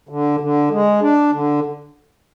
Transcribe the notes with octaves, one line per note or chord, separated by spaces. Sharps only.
D3
D3
G#3
D4
D3